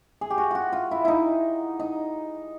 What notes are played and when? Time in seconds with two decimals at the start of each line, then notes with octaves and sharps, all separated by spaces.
0.21 G#4
0.30 G4
0.38 F#4
0.51 F4 F#4
0.72 F4
0.91 E4
1.05 D#4 E4
1.80 D#4